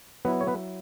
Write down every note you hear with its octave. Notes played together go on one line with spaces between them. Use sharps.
F#3 B3 E4 B4
C#5
B3 B4